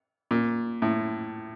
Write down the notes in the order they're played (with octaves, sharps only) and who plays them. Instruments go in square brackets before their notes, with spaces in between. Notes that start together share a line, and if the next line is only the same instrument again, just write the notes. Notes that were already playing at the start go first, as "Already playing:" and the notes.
[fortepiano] A#2
A2